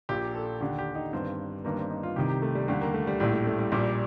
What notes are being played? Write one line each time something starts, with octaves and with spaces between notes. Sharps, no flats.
A#1 A#2 G4
A4
D#2 D3 G4
G4
D#4
G1 G2 D#3 C4
G1 G2 D#3 A#3
C4
D#4
F4
C2 C3 D#3 G4
G4
A3
G3
D#2 D3 G3
A#3
A3
G3
A#1 A2 G3
A3
A3
G3
A#1 A#2 G3